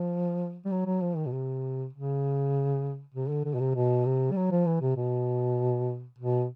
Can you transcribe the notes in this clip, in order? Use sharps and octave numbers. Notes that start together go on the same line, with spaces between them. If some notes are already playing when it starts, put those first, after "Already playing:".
Already playing: F3
G3
F#3
F#3
F3
D#3
B2
C3
C#3
C3
D3
D3
B2
C3
B2
C3
G3
F#3
F3
E3
C3
B2
B2